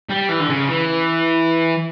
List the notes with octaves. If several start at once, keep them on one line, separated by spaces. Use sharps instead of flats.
G3
E3
D3
C#3
E3